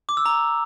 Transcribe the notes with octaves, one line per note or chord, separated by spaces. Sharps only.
D6
E6
A#5